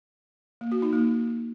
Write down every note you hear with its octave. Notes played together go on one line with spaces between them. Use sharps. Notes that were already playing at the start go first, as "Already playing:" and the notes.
A#3
F#4
D#4
A#3